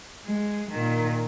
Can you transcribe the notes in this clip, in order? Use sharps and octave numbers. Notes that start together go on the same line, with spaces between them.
G#3
A#2 D#3